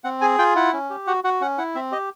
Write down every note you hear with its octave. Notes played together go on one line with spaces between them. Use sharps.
C4 F#5
G#4 G#5
F4 G5
E4 F#5
C#4
G4
F#4 F#5
F#4 F#5
C#4 F#5
E4 F#5
C4 E5
G4 D#5